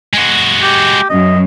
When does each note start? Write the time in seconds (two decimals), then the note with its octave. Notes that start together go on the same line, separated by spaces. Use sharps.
0.13 G#3 F#4
0.63 G4
1.10 F#2 D#5